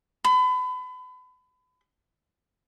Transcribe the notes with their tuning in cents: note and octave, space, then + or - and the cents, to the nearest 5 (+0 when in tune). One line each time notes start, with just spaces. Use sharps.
B5 +35